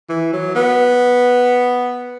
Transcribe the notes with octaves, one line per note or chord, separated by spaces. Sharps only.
E3
F#3
B3